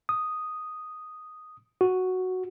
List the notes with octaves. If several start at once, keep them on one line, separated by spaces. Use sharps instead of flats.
D#6
F#4